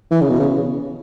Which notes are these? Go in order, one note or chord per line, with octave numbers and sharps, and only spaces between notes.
E3
C#3
B2
C#3